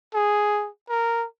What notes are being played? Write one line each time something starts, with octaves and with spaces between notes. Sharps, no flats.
G#4
A#4